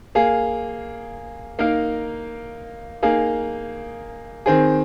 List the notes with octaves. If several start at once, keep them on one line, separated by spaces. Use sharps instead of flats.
A#3 G#4 F5
A#3 D#4 A#4 F5
A#3 D#4 G#4 F5
D#3 C4 G#4